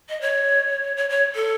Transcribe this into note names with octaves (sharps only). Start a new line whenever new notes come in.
D#5
C#5
C#5
C#5
A4